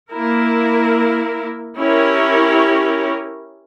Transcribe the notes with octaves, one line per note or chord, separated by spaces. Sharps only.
A#3 E4 A#4
C#4 E4 G4 A#4 C#5